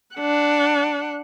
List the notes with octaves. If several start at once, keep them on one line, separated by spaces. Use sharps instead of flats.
D4 F#5